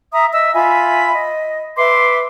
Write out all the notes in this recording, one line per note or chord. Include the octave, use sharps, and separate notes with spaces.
E5 A#5 D#6
D#5 E5 E6
F4 E5 G#5 B5
D#5
B4 E5 C6 D6